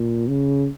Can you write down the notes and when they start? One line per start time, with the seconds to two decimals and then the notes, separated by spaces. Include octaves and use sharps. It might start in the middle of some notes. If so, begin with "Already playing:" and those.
Already playing: A#2
0.28 C#3